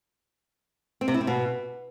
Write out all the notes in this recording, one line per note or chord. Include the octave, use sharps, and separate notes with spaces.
C4
C3
E4
C4
B2